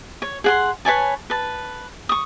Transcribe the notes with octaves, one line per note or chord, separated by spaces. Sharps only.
C#5
G#4 F#5 C6
B4 C#5 G#5 A5
B4 A5
C#6 D#6